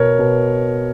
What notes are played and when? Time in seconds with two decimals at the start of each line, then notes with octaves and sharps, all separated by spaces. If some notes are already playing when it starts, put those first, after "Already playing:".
Already playing: B2 A#4 C#5
0.19 B2